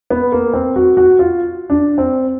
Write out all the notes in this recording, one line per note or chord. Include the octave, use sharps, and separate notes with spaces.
B3
A#3
C4
F#4
F#4
F4
D4
C4